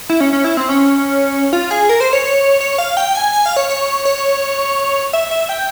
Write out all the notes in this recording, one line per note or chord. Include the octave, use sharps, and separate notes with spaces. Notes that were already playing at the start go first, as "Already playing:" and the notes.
E4
C#4
C#4
E4
C4
C#4
F4
G#4
A#4
C5
C#5
C#5
C#5
F5
G5
G#5
G#5
F5
C#5
C#5
C#5
E5
E5
G5